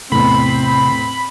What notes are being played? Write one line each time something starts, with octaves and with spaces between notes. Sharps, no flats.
E2 A2 C3 C4 B5